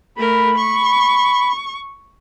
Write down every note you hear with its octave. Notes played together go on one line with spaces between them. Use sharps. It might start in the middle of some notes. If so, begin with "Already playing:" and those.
A3 A#4 B5
C#6